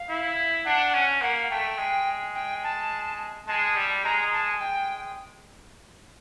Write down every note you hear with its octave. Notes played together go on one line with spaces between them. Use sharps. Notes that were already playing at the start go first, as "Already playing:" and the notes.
Already playing: F5
E4
D4 F#5
C#4
A#3 F#5
A3 G5
G#3
G5
A5
G#3 A5
G3
G#3 A#5
A5
G#5
G#3 G5